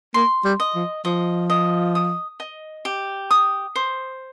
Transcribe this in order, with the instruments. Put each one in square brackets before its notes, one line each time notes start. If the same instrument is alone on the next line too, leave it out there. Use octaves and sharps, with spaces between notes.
[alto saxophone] A#3 [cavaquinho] C6
[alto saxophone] G3
[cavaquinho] D#5
[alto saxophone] F3
[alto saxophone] F3 [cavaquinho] D#5
[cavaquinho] D#5
D#6
D#5
G4
D#6
C5